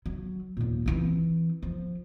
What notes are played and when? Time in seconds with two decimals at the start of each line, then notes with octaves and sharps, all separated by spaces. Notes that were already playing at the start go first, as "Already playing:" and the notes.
0.06 F#3
0.57 D#2 A#2
0.86 E3 C4
1.62 F3